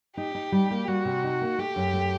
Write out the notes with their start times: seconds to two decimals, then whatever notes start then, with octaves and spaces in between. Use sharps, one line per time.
0.17 D#4 G4
0.35 D#4
0.52 G3
0.70 A#3
0.87 G3 F#4
1.05 C3
1.24 D#4
1.41 A#3
1.58 A3 G4
1.76 F#2
1.94 A3